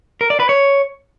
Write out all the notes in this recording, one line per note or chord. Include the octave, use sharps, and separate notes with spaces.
A#4
D5
B4
C#5